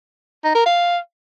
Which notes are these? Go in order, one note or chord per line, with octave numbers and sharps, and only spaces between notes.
D#4
A#4
F5